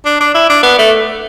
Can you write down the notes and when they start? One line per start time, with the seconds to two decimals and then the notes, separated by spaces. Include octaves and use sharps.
0.05 D4
0.20 D4
0.34 E4
0.50 D4
0.63 B3
0.79 A3